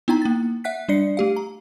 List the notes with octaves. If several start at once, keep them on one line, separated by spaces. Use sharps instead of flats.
B3 D#4 E4 G5 A#5
A#3 A6
E5 F#5 F#6 B6
G3 D4 D5 C7 C#7
A3 G4 F5
A#5